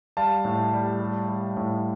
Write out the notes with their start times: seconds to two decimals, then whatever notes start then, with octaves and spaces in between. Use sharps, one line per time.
0.17 G3 F5 A5
0.45 A2
0.73 G3
1.00 G3
1.28 G3
1.57 A2